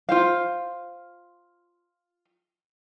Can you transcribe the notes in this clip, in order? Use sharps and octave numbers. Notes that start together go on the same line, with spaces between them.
F4 C5 F5